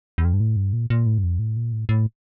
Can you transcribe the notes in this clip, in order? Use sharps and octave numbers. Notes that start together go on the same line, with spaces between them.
E2
F2
G2
A2
G2
A#2
A#2
A2
G2
F2
A2
A#2
A2
A2